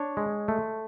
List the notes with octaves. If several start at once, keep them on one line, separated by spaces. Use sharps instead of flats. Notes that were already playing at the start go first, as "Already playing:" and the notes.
Already playing: D4 C#5
G#3
A3